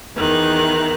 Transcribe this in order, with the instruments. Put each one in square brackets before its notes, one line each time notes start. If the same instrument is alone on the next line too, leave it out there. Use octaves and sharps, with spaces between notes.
[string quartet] E2 D#3 F#6